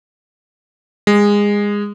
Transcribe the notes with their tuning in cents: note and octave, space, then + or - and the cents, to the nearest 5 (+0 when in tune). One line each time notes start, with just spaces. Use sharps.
G#3 -20